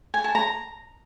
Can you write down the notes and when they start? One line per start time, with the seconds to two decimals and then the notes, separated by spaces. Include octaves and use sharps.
0.14 G#5
0.24 A5
0.35 A#5